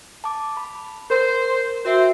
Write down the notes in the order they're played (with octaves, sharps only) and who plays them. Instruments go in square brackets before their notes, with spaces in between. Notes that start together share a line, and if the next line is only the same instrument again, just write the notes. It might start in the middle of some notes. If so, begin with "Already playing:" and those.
[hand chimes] A5 D6
B5
[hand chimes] A#4 [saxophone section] C5
[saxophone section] C4 C5 [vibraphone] F#4 E5